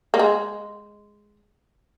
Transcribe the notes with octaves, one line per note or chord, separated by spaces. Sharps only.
A#3
G#3